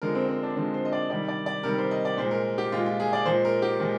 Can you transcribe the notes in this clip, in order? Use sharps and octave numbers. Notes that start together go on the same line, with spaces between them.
D3 F3 G#3 A#4
C4
C4
D4
D3 F3 G#3 D4
C5
D#5
D5
C3 D#3 G3 D5
D5
D5
C3 D#3 G3 A#4
C5
D#5
D5
A#2 G#3 C5
A#4
G4
A#2 G#3 F4
F4
G#4
D5
A#2 F3 G#3 C5
A#4
G4
A#2 F3 G#3